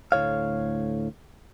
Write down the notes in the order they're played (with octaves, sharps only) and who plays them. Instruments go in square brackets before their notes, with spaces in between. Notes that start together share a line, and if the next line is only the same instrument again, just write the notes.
[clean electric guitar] D2 A2 C#5 F5